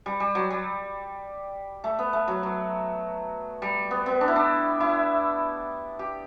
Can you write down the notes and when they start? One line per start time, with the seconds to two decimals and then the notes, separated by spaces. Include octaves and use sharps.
0.06 G3
0.20 G3
0.35 F#3
0.51 G3
1.84 A3
1.99 B3
2.13 A3
2.28 F#3
2.43 F#3
3.62 G3
3.91 B3
4.06 B3
4.21 D4
4.28 E4
4.36 D4
4.80 E4
5.99 G4